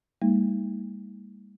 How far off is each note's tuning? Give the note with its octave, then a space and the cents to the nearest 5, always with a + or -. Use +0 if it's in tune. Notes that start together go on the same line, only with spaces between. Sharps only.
G3 +40 A#3 -20 D#4 +35